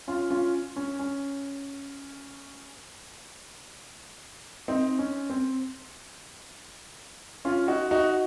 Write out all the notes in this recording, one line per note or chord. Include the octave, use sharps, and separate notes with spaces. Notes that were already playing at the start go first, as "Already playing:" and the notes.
C#4 F4
C#4 F4
C#4
C#4
C4 D#4
C#4
C4
C#4 F4
D#4 F#4
D#4 F#4